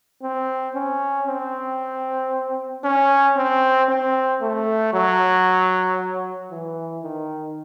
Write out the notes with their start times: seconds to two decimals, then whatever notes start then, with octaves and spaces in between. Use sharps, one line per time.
0.22 C4
0.75 C#4
1.27 C4
2.84 C#4
3.37 C4
3.89 C4
4.42 A3
4.93 F#3
6.51 E3
7.03 D#3